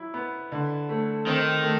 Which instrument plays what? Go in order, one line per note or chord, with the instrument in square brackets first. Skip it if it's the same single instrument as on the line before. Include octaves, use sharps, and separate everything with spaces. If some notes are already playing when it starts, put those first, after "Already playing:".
Already playing: [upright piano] F#3 E4
B3
D3
A3
[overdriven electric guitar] D#3 [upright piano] C4
[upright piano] A3